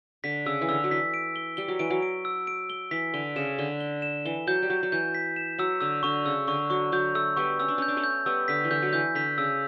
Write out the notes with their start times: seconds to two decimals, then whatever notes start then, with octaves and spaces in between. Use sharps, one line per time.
0.24 D3 B6
0.46 C#3 E6
0.61 E3
0.69 D3 E6
0.84 F#3
0.91 E3 B6
1.14 D7
1.36 G7
1.57 G3 G7
1.68 F#3
1.79 E3 D7
1.90 F#3
2.02 D7
2.25 E6
2.47 D7
2.70 G7
2.91 E3 B6
3.14 D3 G7
3.36 C#3 E7
3.58 D3 G7
3.80 G7
4.02 E7
4.25 E3 G7
4.47 F#3 G6
4.62 G3
4.70 F#3 G6
4.83 F#3
4.92 E3 G6
5.15 B6
5.36 E7
5.59 F#3 E6
5.81 D3 E6
6.03 D3 C#6
6.25 C#3 E6
6.47 D3 C#6
6.70 F#3 C#6
6.92 F#3 G6
7.15 A3 E6
7.37 G3 B3 C#6
7.60 C#4 E6
7.68 D4
7.78 C#4 G6
7.88 D4
7.97 A3 C#4
8.04 G6
8.26 G3 B3 E6
8.48 D3 B6
8.64 E3
8.71 D3 G6
8.82 F#3
8.93 E3 G6
9.15 D3 B6
9.38 C#3 E6